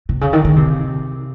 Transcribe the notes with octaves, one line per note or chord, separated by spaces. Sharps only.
C3
C#3
D#3
D#3
C3